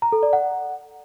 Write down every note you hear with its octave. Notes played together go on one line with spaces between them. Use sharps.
A#5
A4
D5
F#5